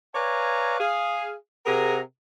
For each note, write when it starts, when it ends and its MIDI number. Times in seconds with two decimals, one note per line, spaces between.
0.14 0.76 71
0.14 0.76 73
0.14 0.76 74
0.14 0.76 77
0.14 0.76 80
0.14 0.76 82
0.79 1.33 68
0.79 1.33 77
1.65 1.99 48
1.65 1.99 68
1.65 1.99 70
1.65 1.99 78
1.65 1.99 82